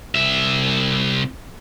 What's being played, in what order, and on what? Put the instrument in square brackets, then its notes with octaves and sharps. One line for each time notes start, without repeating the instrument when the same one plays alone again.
[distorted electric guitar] C2 E5